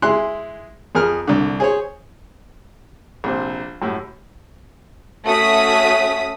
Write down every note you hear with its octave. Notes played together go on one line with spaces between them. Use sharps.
G#3 E4 G#4 C6 F#6
F2 G#4 A#4 F6
C2 D3
G#4 C5 C#5
A#1 C3 C5
F#2 A2 G3
A3 C#4 F#4 D#6 B6